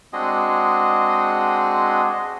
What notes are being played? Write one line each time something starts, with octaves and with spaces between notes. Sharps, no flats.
G#3 C4 D4 F#4 G#4 D#5